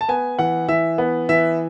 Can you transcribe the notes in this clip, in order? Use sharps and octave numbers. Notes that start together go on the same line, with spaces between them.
A5
B3 G#5
E3 F#5
E3 E5
B3
E3 E5